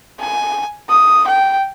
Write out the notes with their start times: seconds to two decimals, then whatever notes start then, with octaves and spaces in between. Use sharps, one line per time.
0.20 G#5
0.89 D#6
1.27 G5